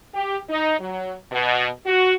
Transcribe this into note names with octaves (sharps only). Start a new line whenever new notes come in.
G4
D#4
F#3
B2
F#4